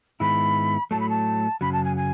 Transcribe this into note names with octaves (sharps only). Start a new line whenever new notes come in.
G#2 D#3 G#3 B3 E4 B5
A2 F#3 A3 A5
B5
A5
F#2 C#3 F#3 B5
A5
G#5
G#5